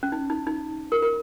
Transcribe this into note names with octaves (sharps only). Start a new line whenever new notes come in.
C#4
D#4
D#4
D#4
A#4
A#4